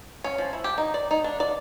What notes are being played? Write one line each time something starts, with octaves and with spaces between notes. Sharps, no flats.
C#4
F3
E4
G4
D#4
D5
D#4
D4
D5